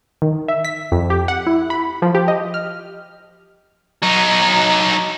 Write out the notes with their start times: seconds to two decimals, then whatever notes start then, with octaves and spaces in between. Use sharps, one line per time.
0.22 D#3
0.48 E5
0.65 B6
0.92 F2
1.10 G4
1.28 F#5
1.47 E4
1.70 B5
2.02 F3
2.15 G4
2.28 D#5
2.54 F6
4.03 F#3 D#4